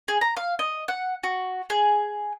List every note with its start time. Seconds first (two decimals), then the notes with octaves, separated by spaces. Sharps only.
0.08 G#4
0.21 A#5
0.37 F5
0.59 D#5
0.88 F#5
1.23 F#4
1.70 G#4